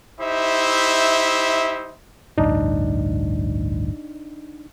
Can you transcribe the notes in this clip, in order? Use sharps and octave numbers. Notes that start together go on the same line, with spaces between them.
D#4 E4 G4 C5 E5
A1 D2 G2 D4 D#4